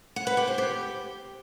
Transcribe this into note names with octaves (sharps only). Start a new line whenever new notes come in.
F#5
B4
G4
C5
G4